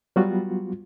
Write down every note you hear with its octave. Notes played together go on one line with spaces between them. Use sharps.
F#3 G3 B3 F4 F#4